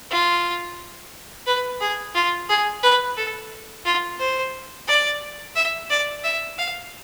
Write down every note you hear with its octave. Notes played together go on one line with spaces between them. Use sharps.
F4
B4
G#4
F4
G#4
B4
A4
F4
C5
D5
E5
D5
E5
F5